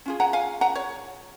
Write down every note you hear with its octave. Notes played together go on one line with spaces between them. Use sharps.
C#4 F4 G#4
F#5 A#5
F5 G#5
F#5 A#5
C#5